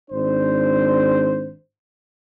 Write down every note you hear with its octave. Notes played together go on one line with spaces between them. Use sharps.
G#1 D4 C5